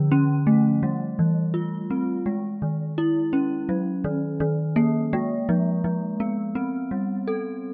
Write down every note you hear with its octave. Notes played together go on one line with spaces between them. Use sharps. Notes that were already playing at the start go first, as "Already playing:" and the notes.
Already playing: D3 F3
C#4
A3
G3
E3
F4
C4
G#3
D#3
E4
C#4
F#3
D#3
D#3
A#3
G#3
F3
F3
B3
C4
G3
A4